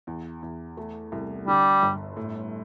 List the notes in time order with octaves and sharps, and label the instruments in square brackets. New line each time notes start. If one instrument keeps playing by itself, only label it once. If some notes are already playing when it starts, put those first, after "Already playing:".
[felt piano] E2
E2
A3
C2
[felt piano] D3 [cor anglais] G3
[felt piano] G1
A2